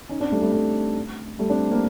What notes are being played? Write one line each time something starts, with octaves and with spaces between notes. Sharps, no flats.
C#4 D#4
C4 D4
G3 A3
G3 A3
G3 A3
G3 A3
C4 D4
A#3 C4